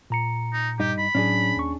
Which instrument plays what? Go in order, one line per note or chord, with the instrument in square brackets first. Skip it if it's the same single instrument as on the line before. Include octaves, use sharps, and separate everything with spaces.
[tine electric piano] A#2 A#5 C#7
[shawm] D#4
[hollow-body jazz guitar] G2 D#4 [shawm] G4
[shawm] B5
[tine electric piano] A2 F#3 [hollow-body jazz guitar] C#4 D4 G#4
[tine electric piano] D#2 C#6